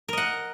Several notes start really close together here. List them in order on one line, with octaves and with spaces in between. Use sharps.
A#4 D#5 F#5